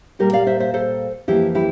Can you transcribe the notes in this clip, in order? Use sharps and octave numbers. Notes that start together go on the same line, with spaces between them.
A#2 G3 A#3 G4 A#4
D5 F5
C5 E5
C5 E5
A4 C5
F2 E3 A#3 E4 G4
E4 G4